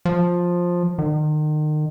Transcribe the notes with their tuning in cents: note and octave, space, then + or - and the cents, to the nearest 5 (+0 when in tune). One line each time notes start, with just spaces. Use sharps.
F3 +10
D#3 -35